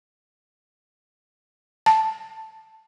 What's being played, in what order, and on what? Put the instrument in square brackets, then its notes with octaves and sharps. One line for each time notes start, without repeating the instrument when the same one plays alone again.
[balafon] A5